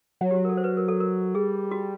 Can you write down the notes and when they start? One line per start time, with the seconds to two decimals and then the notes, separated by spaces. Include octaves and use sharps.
0.21 F#3
0.31 G4
0.35 F#4
0.45 A#4
0.49 A4
0.57 C5
0.64 B4
0.77 A#4
0.88 A4
1.00 A#4
1.34 G3 G#4
1.71 F#4